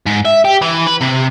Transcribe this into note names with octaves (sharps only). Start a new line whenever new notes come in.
G#2
E5
G4
E3
B4
C3